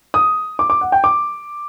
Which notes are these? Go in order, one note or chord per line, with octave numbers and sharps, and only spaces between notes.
D#6
D6
D6
F#5
G5
D6